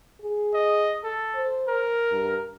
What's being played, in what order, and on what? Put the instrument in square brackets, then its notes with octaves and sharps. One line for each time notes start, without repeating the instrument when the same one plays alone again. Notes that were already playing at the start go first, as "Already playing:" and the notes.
[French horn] G#4
[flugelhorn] D#5
A4
[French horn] C5
[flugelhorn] A#4
[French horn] G2